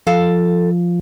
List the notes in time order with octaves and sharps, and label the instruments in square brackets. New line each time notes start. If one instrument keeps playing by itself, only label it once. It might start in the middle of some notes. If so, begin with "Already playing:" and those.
[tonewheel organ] F3 [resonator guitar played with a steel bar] A4 F5